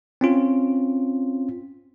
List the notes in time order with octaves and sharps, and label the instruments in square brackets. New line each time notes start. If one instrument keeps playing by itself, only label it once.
[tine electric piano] C4 C#4 F4